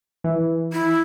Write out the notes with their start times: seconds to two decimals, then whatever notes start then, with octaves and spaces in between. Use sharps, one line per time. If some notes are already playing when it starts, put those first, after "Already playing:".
0.24 E3
0.73 E4